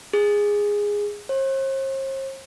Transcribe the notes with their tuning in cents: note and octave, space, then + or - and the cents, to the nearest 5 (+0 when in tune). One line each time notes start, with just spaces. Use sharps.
G#4 -10
C5 +45